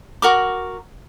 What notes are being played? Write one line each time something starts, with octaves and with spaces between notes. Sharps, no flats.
F#4 A#4 D6